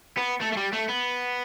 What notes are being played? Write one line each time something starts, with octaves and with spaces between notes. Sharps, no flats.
B3
A3
A3
G3
A3
B3